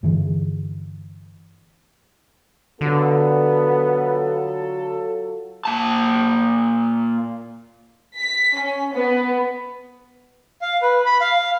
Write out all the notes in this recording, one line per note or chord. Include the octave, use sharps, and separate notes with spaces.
G2 D3 E3 G3
D3 F#3 B3 F4 A4
A#2 A5
B6
C#4
B3
F5
B4
B5
F5